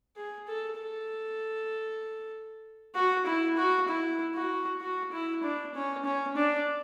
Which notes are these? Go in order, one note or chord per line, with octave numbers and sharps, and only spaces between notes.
G#4
A4
A4
F#4
E4
F#4
E4
F#4
F#4
E4
D4
C#4
C#4
D4